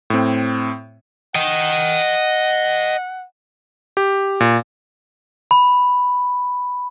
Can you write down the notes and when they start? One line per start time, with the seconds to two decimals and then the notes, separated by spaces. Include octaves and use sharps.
0.10 A2 C4
1.35 D#5 F#5 G5
3.97 G4
4.41 A#2
5.51 B5